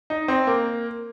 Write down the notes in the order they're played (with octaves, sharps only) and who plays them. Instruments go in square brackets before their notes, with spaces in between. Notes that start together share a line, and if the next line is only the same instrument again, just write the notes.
[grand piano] D#4
C4
A#3